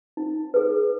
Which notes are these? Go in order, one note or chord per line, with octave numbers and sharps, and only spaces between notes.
D#4
G#4 B4